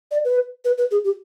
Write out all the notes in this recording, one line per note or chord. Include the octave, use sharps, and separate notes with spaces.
D5
B4
B4
B4
G#4
G4